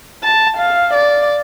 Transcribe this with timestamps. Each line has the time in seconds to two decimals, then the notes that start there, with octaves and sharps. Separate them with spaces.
0.24 A5
0.57 F5
0.94 D5